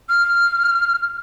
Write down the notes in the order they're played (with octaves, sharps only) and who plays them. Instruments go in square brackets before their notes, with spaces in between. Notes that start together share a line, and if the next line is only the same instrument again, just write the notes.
[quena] F6